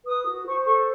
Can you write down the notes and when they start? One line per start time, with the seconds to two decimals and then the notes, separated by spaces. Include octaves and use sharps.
0.05 B4 D#6
0.25 F#4
0.46 C5 C#6
0.65 A4 C#6